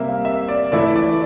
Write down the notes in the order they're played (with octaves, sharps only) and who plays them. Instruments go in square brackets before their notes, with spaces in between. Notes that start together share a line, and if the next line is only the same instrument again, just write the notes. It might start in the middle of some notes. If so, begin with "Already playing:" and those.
Already playing: [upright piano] C3 G3 A#3 [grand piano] E5
[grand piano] F5
E5
D5
[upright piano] E3 A3 E4 [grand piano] D5
[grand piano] D5